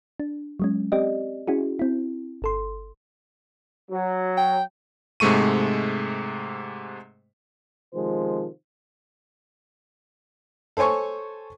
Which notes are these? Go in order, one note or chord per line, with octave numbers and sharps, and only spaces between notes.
D4
F#3 G#3 C#4
C4 G4 D5 D#5
C#4 E4 F#4 G#4
C4 E4
G1 A4 C6
F#3
G5
G#2 C3 G#3 A3 C#6 D#7
C3 D#3 F3 G#3 C5
A4 C5 C#5 G#5 C#6